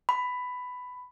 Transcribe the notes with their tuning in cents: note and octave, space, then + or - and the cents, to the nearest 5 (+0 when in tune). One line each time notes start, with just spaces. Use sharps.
B5 +10